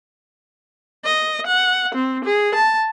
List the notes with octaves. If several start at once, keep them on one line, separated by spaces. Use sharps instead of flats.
D#5
F#5
C4
G#4
A5